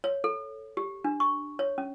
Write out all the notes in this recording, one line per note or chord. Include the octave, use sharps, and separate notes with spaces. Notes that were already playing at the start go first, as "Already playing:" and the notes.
C#5
A4
G4
D4
C#6
C#5
C#4